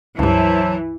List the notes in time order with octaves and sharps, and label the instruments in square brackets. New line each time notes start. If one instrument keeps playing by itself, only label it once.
[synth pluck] C#2 G2 [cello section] E3 [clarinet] F#3 [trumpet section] E4 C5 A5